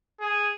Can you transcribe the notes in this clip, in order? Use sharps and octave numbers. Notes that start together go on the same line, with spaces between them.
G#4